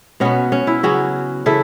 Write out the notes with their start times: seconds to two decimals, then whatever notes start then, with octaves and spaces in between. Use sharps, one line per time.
0.20 B2 B3 C#4 F#4
0.52 C#4
0.67 E4
0.83 C#3 F#3 B3 C#4 F#4
1.46 C#3 E3 E4 A4